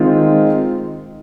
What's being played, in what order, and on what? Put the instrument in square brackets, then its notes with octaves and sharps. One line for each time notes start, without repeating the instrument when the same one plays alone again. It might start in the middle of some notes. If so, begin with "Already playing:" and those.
Already playing: [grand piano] D#3 G#3 C4 F4